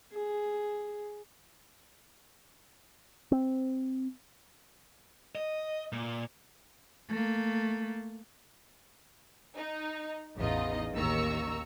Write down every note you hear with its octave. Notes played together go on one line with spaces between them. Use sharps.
G#4
C4
D#5
A#2
A3 A#3
D#4
A1 E2 D#4 F4 D#5
A1 D#2 D#3 A#5 C#6 E6